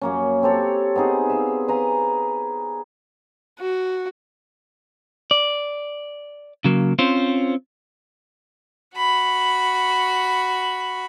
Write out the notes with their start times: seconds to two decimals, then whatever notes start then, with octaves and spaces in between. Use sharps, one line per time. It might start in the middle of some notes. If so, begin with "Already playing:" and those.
0.02 F#2 A#3 C#4
0.43 C4 G4 A4 C#5
0.95 B3 C4 D#4 G#4
1.30 E5 F5
1.68 B4 F5 G#5 A#5
3.60 F#4
5.31 D5
6.65 C#3 F#3 A#3
6.99 C4 C#4 F4 C5
8.96 F#4 B5